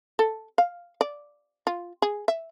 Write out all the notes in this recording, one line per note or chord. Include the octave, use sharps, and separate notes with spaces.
A4
F5
D5
F4
G#4
E5